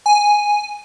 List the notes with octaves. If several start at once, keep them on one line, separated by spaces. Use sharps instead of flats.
G#5